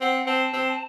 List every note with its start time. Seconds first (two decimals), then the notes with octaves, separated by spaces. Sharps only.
0.01 C4 F#5
0.27 C4 A5
0.53 C4